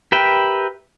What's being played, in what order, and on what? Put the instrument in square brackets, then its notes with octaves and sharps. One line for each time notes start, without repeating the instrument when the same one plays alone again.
[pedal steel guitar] G4 A#4 B4 E5 G5